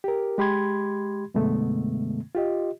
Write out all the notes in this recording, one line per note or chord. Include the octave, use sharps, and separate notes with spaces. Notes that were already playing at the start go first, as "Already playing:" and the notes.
G4 A#4
G#3 G4 B5 C6 G#6
F#2 B2 D3 G#3 A3 B3
F4 G4 D#5